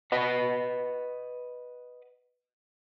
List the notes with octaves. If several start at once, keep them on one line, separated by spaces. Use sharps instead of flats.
B4 D#5 F#5